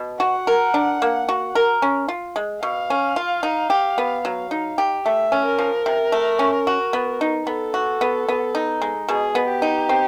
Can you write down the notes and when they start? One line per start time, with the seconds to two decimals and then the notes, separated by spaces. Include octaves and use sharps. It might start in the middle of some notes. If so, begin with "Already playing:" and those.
Already playing: B2
0.20 F#4 F#5
0.47 A#4
0.74 D4
1.02 A#3
1.29 F#4
1.55 A#4
1.82 C#4
2.08 F4
2.36 G#3
2.63 B2 F5
2.90 C#4
3.16 F4
3.43 D#4
3.70 G4
3.98 B3
4.25 F#3
4.51 D#4
4.78 G4
5.06 A3 E5
5.32 C#4
5.46 A#4
5.59 F3
5.86 C3
6.12 A3
6.39 C#4
6.67 F#4
6.93 B3
7.21 D#4
7.47 B3 A4
7.74 F#4
8.01 B3
8.29 B3
8.55 D#4
8.82 G#3
9.09 B2 G#4
9.35 B3
9.49 G4
9.62 D#4
9.89 C4